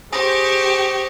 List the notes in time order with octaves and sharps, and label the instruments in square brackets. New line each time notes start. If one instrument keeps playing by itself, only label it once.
[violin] G4 [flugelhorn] G#4 [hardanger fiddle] C5 C#6 [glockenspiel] G#5 D#6 A#6